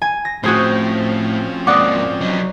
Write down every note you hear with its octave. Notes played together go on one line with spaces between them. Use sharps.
G#5
A#6
A2 F3 C4 C#4 F#4 G#4 C5
G#2 A#3 D5 F#5 D6 D#6
F#3 D#4